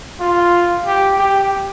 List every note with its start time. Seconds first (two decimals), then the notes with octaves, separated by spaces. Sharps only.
0.20 F4
0.86 G4
1.18 G4